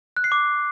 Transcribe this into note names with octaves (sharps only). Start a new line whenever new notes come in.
F#6
C7
D6